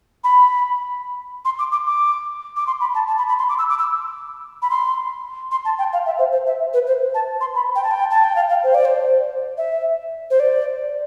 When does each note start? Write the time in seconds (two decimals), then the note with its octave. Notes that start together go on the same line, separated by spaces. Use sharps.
0.24 B5
1.45 C6
1.59 D6
1.72 D6
1.87 D6
2.56 D6
2.67 C6
2.80 B5
2.95 A5
3.07 A5
3.18 B5
3.28 B5
3.39 C6
3.49 D6
3.58 E6
3.70 D6
3.79 E6
4.62 B5
4.70 C6
5.51 C6
5.65 A5
5.78 G5
5.93 F5
6.06 E5
6.19 C5
6.32 C5
6.46 E5
6.73 B4
6.87 C5
7.14 A5
7.41 C6
7.55 B5
7.75 G5
7.84 A5
7.91 G5
8.11 A5
8.24 G5
8.36 F5
8.49 F5
8.64 C5
8.75 D5
8.85 C5
9.57 E5
10.30 C5
10.40 D5